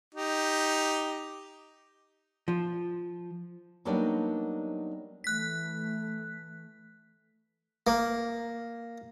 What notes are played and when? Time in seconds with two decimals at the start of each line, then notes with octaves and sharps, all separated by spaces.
0.15 D#4 G4
2.48 F3
3.85 F#3 G3 A#3 B3 D4 D#4
5.24 E3 A3 F#6 B6
7.87 A#3